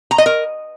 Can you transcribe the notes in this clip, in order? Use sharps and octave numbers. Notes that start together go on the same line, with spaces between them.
A#5
D#5
A#4